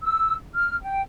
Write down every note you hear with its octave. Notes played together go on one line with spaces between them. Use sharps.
E6
F6
G5